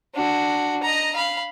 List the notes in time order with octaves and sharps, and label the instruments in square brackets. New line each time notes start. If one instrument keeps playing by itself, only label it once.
[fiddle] D4 F#4
D#5 A#5
F5 B5